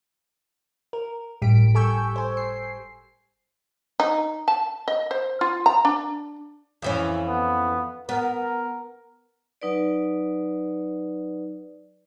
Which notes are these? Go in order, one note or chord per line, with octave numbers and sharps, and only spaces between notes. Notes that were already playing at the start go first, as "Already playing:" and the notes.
A#4
G1 A2 G3 G4 B6 D7
A4 G#5 C#6 E6 G6
C5 G#5
C7
D#4
A5
D#5
C5
F4
A#5
D4
F2 E3 C#4
B3
B3 A#4
F#3 D#4 B4 D5